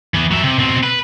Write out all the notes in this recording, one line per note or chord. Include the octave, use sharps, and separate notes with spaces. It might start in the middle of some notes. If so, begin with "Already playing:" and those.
E3 B3
F#3 E5
C3
B2 C4
B4